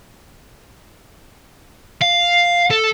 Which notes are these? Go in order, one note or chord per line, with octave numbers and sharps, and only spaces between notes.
F5
A4